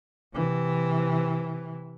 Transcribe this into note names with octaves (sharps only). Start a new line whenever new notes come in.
C3 E3